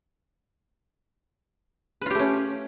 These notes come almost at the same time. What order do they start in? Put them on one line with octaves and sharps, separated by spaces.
B4 F4 G4 A3 C#4